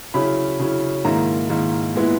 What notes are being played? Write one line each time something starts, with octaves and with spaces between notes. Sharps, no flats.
C#3 F#3 C#4 E4 B5
C#3 F#3 C#4 E4
G#2 D#3 A#3 E4 A#5
G#2 D#3 A#3 E4
A#2 G#3 B3 E4